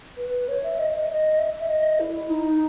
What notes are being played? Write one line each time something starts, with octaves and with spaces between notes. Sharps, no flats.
B4
C#5
E5
D#5
D#5
D#5
E5
D#5
E4
D#4